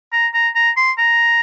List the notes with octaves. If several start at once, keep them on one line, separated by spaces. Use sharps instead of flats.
A#5
A#5
A#5
C6
A#5